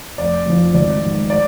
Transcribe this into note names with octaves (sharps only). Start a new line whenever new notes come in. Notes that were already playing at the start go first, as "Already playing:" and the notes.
F1 D5
F2 F3
G#1 D5
G#2 F#3
D5